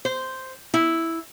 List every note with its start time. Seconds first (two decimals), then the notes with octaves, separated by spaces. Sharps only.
0.05 C5
0.74 E4